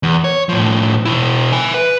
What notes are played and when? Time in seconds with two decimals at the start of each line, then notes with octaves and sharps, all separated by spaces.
0.03 E2
0.24 C#5
0.49 A2 F3
1.05 B2 E4
1.52 E5 G#5
1.74 B4